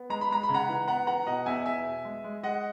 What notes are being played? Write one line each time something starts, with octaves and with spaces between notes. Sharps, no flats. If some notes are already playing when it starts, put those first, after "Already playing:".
Already playing: B3
G#3 A#5
B5
G#3 A#5
B5
C#3
F#5 A#5
E3
B3 F#5 A#5
E3 F#5 A#5
B2 D#5 F#5
E2 E5 G#5
E2 E5 G#5
B2
G#3
G#3
G#3 D#5 F#5